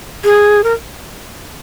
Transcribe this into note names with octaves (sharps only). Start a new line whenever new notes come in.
G#4
A#4